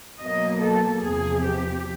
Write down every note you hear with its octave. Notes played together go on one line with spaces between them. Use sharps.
B2 F#3 A#3 D#5
A4
E2 C3 F3 G#4
G4